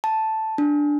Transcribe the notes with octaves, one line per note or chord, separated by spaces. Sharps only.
A5
D4